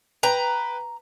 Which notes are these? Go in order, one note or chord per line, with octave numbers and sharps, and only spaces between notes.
B4 G5 A#5